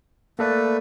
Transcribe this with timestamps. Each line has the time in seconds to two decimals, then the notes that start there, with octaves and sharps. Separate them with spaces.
0.39 A3 A#3 A4 B4 D5